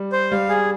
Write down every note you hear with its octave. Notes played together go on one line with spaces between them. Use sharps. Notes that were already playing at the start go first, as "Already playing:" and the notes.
Already playing: G3
C5
G3 F5
G#4